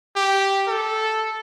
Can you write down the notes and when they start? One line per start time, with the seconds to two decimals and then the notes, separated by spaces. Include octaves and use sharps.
0.16 G4
0.68 A4